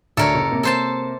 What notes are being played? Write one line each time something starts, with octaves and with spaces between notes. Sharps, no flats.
D2 A4 A#4 C#5 D5 E5
F#1
C3 A#3
A4 C5 A5